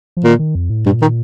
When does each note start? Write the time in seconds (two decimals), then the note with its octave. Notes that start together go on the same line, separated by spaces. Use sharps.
0.17 F3
0.24 A#2 D#3
0.39 D#3
0.55 F2
0.70 A2
0.85 G2 A#2
1.02 D#3